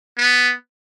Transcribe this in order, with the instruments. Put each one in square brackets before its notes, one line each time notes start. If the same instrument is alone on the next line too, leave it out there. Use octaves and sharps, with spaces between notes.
[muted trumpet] B3